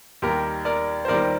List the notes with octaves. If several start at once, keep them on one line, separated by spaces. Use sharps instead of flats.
D#2 D#3 G3 G4 A#4
A#4 D5
C5
D#2 D#3 G3 A#4 D5